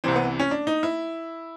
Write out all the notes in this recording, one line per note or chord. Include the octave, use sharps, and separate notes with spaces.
C2 C3 E3 C4
B3
C#4
D4
D#4
E4